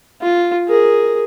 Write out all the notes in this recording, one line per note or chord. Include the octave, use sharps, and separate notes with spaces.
F4
G#4 A#4